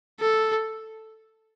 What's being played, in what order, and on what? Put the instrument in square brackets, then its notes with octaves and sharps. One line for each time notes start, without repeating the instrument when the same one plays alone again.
[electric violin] A4